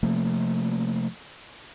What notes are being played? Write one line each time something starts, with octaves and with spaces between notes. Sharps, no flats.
C3 F3 A3 A#3